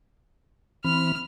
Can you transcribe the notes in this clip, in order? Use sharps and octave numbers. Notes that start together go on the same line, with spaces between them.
E3 C4 B5 F6